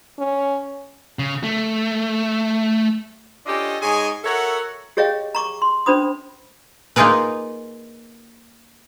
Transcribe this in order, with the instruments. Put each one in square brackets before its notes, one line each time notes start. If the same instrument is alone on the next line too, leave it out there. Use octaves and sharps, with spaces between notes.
[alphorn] C#4
[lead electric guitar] C#3
A3
[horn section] C#4 D4 F4 G4 A4 D#5
G#2 G#4 C#5 D#5 G#5
F#4 A4 A#4 C#5 E5 F#5
[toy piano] G4 G#4 C#5 D#5 F5 G5
A#5 C#6 D6
C6
C#4 D4 C5 B5 D#6
[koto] A#3 D#4 F4 G#4 A#4 B4